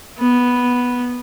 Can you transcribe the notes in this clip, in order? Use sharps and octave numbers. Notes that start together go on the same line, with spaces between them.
B3